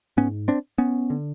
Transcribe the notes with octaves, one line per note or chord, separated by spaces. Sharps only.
G#2 B3 C#4
C4 D4
B3 C#4
D3